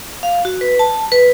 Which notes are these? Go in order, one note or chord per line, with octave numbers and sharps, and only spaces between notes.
F5
F#4
B4
A5
B4